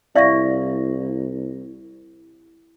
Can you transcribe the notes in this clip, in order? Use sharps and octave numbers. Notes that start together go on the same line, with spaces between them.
C2 E4 D5 E5 F5 C#6 A#6